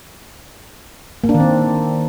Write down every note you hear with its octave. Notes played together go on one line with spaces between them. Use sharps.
A#3
D4
D#3
C4